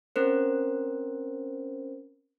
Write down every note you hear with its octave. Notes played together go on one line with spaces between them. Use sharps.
C4 C#4 A#4 C5